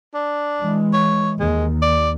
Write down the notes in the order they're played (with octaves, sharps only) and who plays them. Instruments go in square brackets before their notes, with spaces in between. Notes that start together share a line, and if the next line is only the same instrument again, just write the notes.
[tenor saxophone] D4
[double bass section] E3 G#3
[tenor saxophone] C#5
[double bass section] D#2 [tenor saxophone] G#3
[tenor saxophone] D5